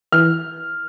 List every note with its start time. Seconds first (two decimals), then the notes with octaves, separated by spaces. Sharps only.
0.12 E3 F6